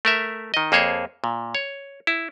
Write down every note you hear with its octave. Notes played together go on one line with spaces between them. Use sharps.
A3 A#4 E5
D#3 D#5
F2 A#3 G#4 C5 C#5
A#2
C#5
E4